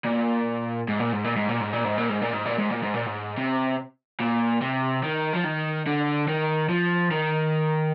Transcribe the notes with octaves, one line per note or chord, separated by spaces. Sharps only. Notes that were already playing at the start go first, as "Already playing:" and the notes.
A#2
G#2
A#2
G#2
A#2
G#2
A#2
G#2
A#2
G#2
A#2
G#2
A#2
G#2
A#2
G#2
A#2
G#2
A#2
G#2
C3
A#2
C3
D#3
F3
D#3
D3
D#3
F3
D#3